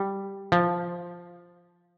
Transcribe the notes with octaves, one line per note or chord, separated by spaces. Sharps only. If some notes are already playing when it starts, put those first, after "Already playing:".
Already playing: G3
F3